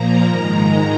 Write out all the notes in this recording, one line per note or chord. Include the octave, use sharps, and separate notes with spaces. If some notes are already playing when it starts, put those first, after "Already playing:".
Already playing: A#2 F3 A#3 A#5
G#2 D#3 G#3